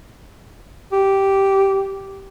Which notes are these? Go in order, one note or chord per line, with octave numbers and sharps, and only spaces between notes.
G4